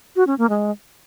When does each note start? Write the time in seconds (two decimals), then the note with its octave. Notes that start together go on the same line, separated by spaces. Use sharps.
0.16 F#4
0.27 C#4
0.38 A#3
0.49 G#3